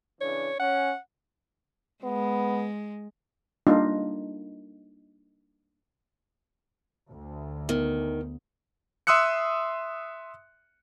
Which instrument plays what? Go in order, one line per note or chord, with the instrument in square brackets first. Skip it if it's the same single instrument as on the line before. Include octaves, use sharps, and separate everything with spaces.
[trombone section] C#3 E3 D4 [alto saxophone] C#5
[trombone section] C#4 [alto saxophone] F#5
[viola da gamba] G#3 [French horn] B3
[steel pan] G3 A#3 D4 D#4 F4
[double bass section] D2
[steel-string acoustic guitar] D#3 [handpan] B3
[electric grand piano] E5 C6 D#6 E6 F#6 C#7